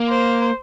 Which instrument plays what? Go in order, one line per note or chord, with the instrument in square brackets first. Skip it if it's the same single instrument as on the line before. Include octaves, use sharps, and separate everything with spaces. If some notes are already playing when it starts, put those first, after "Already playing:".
Already playing: [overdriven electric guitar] A#3
[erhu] C5